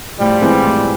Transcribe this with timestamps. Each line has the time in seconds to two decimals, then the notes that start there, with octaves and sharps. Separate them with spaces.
0.19 A2 F3 G3
0.42 E3 G#3 C4
0.63 A2